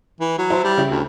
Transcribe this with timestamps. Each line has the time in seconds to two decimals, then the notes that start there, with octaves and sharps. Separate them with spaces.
0.20 E3
0.38 F#3
0.50 E4 C5 A5
0.64 G3
0.78 C#3 E4 G4
0.90 D2